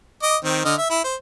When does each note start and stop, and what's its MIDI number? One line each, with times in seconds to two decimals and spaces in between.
0.23 0.37 75
0.23 0.37 86
0.44 0.63 51
0.44 0.63 60
0.65 0.75 50
0.65 0.75 75
0.65 0.75 89
0.78 0.87 76
0.90 1.03 64
1.04 1.15 72